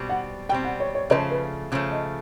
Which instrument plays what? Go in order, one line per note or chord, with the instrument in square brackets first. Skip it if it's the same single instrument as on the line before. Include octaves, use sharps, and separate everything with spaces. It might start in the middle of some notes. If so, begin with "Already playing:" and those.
Already playing: [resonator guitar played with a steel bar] B2 G3 C4
[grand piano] F#5
[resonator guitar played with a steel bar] B2 G3 C4 [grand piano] G5
[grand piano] F#5
C#5
C#5
[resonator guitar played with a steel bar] C#3 F3 A3 [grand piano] C5
[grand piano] B4
[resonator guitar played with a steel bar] C#3 F3 A3
[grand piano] D#5